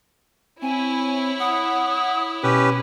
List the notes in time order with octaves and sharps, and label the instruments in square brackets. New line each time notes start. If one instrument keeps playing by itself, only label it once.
[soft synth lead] C4 [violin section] E4 C#5 [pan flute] G#5
[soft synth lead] F#5 [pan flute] D#6
[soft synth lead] B2 [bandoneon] C#4 G4 B4